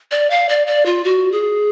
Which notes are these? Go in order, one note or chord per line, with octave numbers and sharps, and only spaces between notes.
D5
F5
D5
D5
F4
F#4
G#4